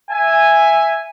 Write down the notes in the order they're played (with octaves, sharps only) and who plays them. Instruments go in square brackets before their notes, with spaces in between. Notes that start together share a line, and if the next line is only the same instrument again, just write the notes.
[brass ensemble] E5 G#5